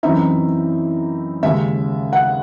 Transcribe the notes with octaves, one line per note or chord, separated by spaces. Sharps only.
F#2 E3 C4 D#4 E5
D#2 C#3 G#3 C#4 E5
F#5